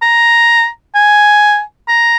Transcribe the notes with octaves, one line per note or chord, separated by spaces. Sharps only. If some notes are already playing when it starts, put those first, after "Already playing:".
A#5
G#5
A#5